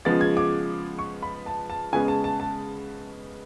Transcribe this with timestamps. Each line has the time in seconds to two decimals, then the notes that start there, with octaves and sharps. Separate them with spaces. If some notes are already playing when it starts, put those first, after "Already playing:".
0.05 C#3 F3 G#3 B3 A6
0.21 G#6
0.37 D6
0.99 C#6
1.22 B5
1.46 A5
1.70 A5
1.93 C#3 G#3 B3 G#5
2.08 A5
2.24 A5
2.40 A5